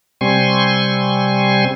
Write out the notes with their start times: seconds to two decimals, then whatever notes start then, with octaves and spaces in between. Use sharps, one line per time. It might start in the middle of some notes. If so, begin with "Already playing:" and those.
0.21 C3 G3 C4 G#5 C6 C#6